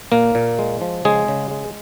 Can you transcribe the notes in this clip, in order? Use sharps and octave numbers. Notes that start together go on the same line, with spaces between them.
A#2 A#3 A#4
A#2
G#3
F3
C#3 G#3 G#4
C#3
G#3